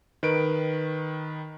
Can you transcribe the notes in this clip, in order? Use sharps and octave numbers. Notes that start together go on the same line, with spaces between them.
D#3 B4 D7